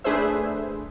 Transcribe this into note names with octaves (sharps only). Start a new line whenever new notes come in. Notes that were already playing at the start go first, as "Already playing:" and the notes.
A3 D4 G#4 B4 C5 E5